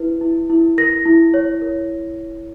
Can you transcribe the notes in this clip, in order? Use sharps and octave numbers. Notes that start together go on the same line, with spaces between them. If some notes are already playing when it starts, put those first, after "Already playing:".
Already playing: E4 B4
E4
E4
A#4 A#6
E4
C#5
A#4